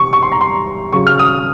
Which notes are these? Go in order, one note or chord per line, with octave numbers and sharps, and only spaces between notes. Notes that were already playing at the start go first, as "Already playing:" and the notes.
Already playing: C3 C#6
C#6
C6
A#5
C6
C#3 F#3 C#6
F6
D#6